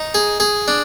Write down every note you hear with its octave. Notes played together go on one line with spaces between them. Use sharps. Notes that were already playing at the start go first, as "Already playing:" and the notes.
Already playing: D#4
G#4
G#4
D4